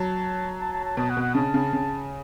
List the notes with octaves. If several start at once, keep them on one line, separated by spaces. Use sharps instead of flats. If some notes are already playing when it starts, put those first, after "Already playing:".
Already playing: F#3 A5
A5
A5
A5
B2 A5
F#5
B2
F#5
C#3 A5
C#3
C#3